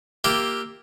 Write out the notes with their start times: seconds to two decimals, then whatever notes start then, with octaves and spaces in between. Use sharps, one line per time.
0.24 A#3 F4 G4 E5